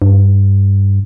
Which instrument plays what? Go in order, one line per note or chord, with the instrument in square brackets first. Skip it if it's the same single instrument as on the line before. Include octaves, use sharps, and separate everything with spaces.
[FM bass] G2